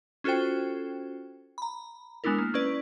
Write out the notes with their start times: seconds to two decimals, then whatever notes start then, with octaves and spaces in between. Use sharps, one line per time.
0.24 C#4 F4 F#4 A4 C5 G5
1.58 A#5 B5
2.24 G#3 B3 D4 E4 A#4
2.38 A#3
2.54 C#4 E4 B4 D5